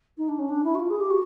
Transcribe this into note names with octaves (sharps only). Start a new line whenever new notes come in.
D#4
D4
C#4
D4
E4
F#4
F4
G#4
G4
F#4